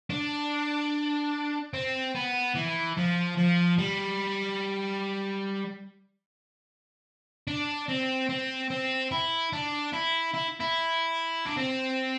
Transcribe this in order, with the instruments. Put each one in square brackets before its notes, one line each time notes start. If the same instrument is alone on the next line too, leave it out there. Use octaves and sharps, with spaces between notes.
[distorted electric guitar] D4
C4
B3
E3
F3
F3
G3
D4
C4
C4
C4
E4
D4
E4
E4
E4
D4
C4